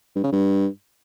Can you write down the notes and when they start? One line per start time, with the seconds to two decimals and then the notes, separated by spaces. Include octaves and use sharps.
0.16 G2
0.24 C#3
0.32 G2